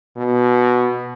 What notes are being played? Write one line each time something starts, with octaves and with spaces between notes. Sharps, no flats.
B2